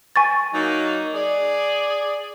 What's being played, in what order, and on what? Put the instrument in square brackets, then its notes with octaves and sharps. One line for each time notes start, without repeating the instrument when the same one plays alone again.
[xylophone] G#5 C#6 A6
[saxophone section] F#3 A#3 D#4
G#4 D5